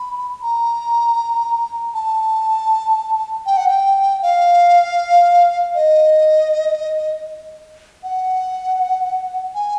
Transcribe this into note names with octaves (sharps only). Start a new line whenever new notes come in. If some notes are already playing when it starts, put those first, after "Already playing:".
Already playing: B5
A#5
A5
G5
F#5
G5
F5
D#5
F#5
G#5